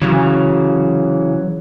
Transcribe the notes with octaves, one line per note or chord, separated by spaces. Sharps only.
C#3 E3 F#3